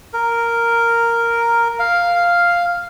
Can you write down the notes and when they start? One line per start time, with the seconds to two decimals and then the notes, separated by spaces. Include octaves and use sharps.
0.13 A#4
1.79 F5